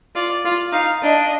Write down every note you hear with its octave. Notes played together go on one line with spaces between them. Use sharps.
F4 D5
F4
D#4 F5
D4 D#5